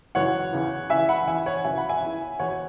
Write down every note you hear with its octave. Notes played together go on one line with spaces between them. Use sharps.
F#2 C#3 E3 C#5 F#5
E2 C#3 E3
C#2 C#3 E3 E5 G#5
F#5 B5
E2 E3 E5 G#5
C#5 F#5
F#2 C#3 E3 E5 G#5
F#5 B5
E5 G#5
E2 E3
E2 B2 C#5 F#5